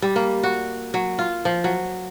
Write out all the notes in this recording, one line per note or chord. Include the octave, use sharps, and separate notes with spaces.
G3
A#3
F#4
F#3
F4
F3
F#3